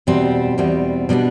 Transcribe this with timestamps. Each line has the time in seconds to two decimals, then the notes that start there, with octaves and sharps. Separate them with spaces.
0.07 E2 B2 G3 C4
0.58 E2 B2 G3 C4
1.09 B2 G3 B3 D4